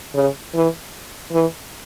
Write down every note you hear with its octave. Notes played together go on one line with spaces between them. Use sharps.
C#3
E3
E3